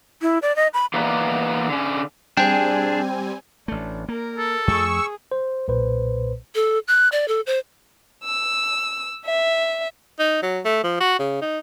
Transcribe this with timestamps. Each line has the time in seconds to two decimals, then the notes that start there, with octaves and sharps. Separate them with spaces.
0.22 E4
0.42 D5
0.56 D#5
0.74 B5
0.94 E3 A#3 B3 D#4 B4 D5
1.68 D3 C#4
2.37 G3 C4 D4 G#4 G5 G#5
3.68 A1 A3 D4
4.09 A#3 A#4
4.38 A4
4.68 F2 A3 G#4 C#6 E6
5.32 C5
5.68 B1 A#2 B4 C5
6.55 A4
6.88 F#6
7.12 D5
7.28 A4
7.47 C5
8.24 E6
9.25 E5
10.19 D#4
10.42 F#3
10.65 A3
10.83 F3
11.00 F#4
11.19 C#3
11.41 D#4